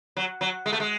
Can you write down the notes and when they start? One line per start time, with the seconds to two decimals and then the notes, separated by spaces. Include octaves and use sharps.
0.17 F#3
0.41 F#3
0.66 G#3
0.73 A3
0.80 G#3